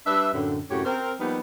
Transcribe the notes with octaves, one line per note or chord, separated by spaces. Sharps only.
G3 D4 B4 E5
F#2 A2 D3
F#2 A2 C3 F#4 G4 C#5
C4 A#4
F3 G3 A#3 B3 D#4